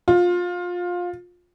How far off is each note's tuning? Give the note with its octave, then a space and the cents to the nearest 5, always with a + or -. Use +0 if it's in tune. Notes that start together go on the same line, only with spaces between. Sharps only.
F4 +20